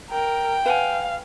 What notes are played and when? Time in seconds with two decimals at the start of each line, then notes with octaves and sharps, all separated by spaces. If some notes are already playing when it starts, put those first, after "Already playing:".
0.11 A#4 G5
0.66 B4 F5 F#5 G#5